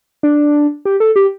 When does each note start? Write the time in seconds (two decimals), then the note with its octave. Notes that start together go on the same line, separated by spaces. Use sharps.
0.23 D4
0.85 G4
1.00 A4
1.16 G4